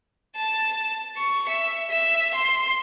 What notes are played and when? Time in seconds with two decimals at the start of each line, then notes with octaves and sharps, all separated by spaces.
0.36 A5
1.17 C#6
1.48 E5
1.90 E5
2.34 C6